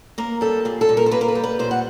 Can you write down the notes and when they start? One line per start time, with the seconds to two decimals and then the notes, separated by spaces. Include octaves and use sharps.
0.18 A#3 A#4
0.41 G3 A4
0.65 A#2 G#4
0.81 A4
0.89 A#2
0.97 A#4
1.06 C5
1.11 A#3 B4
1.21 A#4
1.28 B4
1.35 G3
1.44 B4
1.59 A#2 C5
1.71 F#5